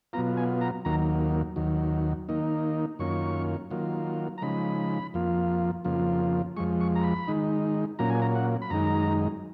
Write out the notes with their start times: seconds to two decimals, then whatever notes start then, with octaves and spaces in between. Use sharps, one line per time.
0.13 B2 F#3 B3 F4 A#5
0.37 G#5
0.61 A#5
0.85 D#2 D#3 F#3 A#3 A#5
1.56 D#2 D#3 F#3
2.29 D#3 A#3 D#4
2.99 F#2 D#3 A#3 C#4 F4 C#6
3.71 D#3 F#3 A#3 F4
4.38 A#5
4.42 C#3 F3 G#3 D#4 B5
5.14 F2 F3 A#3 F4
5.85 F2 C#3 F3 A#3 F4
6.57 F2 F3 G#3 C#6
6.81 C#6
6.95 A#5
7.04 B5
7.28 D#3 G#3 D#4
7.99 A#2 F#3 A#3 C#4 F4 A#5
8.10 G#5
8.22 A#5
8.35 F#5
8.62 B5
8.70 F#2 D#3 G#3 D#4 A#5